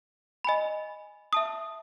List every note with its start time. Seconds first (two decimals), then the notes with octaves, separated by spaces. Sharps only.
0.44 D#5 G#5 B5
1.33 E5 A5 D#6